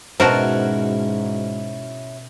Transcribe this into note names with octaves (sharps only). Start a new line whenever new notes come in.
G#2 B2 C#4 E4 F#4 A#4 C5 A5